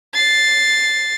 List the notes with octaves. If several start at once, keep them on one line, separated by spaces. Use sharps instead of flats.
A6 C7